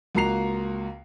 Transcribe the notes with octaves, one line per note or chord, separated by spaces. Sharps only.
C#2 A#3 F#4 A#5 C7 F7